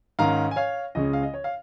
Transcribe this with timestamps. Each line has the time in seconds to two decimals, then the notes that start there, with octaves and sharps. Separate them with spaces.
0.19 G#2 D#3 C#4 F5 A#5
0.51 G#5
0.56 C#5 F5
0.95 C#2 C#3 G#3 C#4 D#5
1.13 F5
1.23 D#5
1.34 C#5
1.44 F5